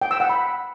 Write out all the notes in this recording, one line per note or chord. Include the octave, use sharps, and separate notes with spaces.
G5
E6
F#5
B5